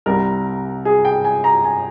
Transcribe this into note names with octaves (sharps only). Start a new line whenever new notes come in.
C2 C3 G3 A#4
G#4
G5
G#5
A#5
G#5